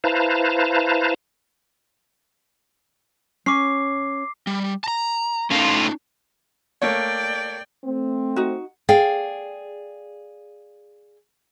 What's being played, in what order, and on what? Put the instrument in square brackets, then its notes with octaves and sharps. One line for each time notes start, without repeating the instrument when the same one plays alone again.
[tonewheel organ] E4 B4 C5 F5 A5 A#5
[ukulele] C#4 [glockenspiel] D6 C7
[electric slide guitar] G3
A5 A#5
[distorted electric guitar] A2 F4 [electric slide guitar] C#4 D#4
[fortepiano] A3 A#3 C#5 [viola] D5 G5
[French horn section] A3 C4
[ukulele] D#4 F#4
[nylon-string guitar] G#4 D5 F5 G5